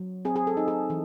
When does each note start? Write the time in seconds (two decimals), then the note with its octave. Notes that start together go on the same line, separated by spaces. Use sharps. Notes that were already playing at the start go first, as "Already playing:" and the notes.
Already playing: F#3
0.25 C4 G#4
0.36 G#4
0.47 A4
0.57 D#4
0.68 G#4
0.90 E3